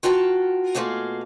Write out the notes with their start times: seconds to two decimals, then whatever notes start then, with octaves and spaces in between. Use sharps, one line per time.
0.03 F4 F#4 A#4 G5 A5
0.75 B2 A3 A#3 F4 G#4